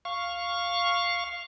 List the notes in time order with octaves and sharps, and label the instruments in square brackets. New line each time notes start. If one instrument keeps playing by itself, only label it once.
[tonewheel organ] F5 C#6